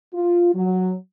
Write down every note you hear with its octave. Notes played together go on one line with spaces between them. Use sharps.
F4
F#3